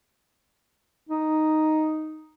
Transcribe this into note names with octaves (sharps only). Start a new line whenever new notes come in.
D#4